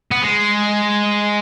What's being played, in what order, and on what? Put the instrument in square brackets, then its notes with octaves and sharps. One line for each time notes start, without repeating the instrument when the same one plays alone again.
[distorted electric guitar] B3
G#3